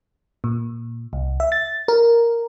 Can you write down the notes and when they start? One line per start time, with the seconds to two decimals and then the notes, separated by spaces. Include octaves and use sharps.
0.44 A#2
1.13 C2
1.40 E5
1.52 A6
1.88 A#4